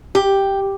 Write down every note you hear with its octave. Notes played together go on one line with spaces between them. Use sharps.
G4